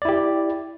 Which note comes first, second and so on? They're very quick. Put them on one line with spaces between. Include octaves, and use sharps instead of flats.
D5 E4 G4